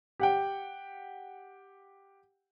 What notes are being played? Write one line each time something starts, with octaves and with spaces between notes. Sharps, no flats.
G4 F#5 G5